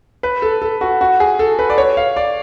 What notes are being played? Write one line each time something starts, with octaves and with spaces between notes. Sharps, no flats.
B4
A4
A4
F#4
F#4
G#4
A4
B4
D5
C#5
F5
D5